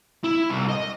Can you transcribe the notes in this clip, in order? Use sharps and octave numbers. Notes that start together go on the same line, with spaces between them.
E4
C2
D#5